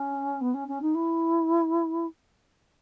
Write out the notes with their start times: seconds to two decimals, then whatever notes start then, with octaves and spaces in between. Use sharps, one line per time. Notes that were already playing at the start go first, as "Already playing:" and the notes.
Already playing: C#4
0.41 B3
0.54 C#4
0.68 C#4
0.82 D#4
0.95 E4